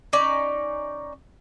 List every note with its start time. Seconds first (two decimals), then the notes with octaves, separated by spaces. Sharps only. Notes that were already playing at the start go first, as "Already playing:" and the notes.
0.13 C#4 D#4 D5